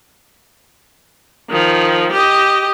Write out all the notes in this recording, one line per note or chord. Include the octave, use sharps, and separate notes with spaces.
D#3 F3
G4 D#5